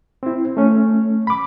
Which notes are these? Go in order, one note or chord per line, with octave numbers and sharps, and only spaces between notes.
C4 E4
A3 C#4
B5 D6